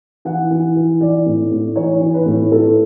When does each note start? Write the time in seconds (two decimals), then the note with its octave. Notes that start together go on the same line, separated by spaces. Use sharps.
0.25 E3 F#5
0.51 E3
0.75 E3
1.00 E3 D5
1.26 A2
1.51 A2
1.76 E3 C#5
2.01 E3
2.14 B4
2.26 A2
2.51 A2 A4